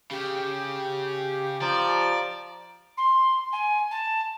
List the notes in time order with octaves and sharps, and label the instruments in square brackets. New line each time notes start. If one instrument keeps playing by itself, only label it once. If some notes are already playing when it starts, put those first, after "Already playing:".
[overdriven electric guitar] C#3 [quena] G4
[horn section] F3 [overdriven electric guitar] D5 [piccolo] A#5
[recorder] C6
G#5
A5